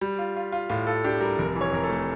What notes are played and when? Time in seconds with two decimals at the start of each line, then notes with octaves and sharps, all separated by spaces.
0.01 G3
0.19 F4
0.37 F4
0.52 F4
0.69 A2 F4
0.87 F4 A4
1.04 D4 G4
1.21 G3 A#4
1.38 F1 A#4
1.55 E3
1.61 C#5
1.72 F2 A#4
1.84 A4
1.89 A3